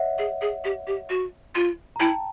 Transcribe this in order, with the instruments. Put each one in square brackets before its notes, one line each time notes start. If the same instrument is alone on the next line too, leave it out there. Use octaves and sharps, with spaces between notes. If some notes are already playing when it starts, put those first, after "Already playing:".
Already playing: [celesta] C#5 D#5 E5 F#5
[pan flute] G#4
G#4
G4
G4
F#4
F4
[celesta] A#5
[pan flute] E4 [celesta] G5 A5